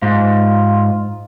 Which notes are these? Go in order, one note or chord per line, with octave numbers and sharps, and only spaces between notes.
G#2 F4